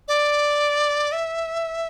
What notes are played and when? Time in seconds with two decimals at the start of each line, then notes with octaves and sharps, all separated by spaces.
0.08 D5
1.12 E5